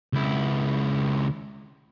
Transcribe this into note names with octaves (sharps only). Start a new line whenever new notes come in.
C#2 E4